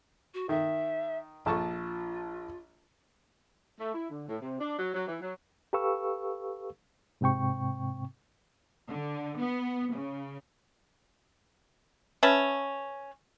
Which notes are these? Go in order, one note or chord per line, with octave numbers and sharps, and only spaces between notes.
F#4
D#3 E5
A#1 F4 A5 C#6
A3
E4
D3
A2
C3
D4
F#3
F#3
E3
F#3
G4 A4 B4 F5 C#6 E6
G#2 C3 C4 G5 C#6
D3
B3
C#3
C#4 B4 E5 A5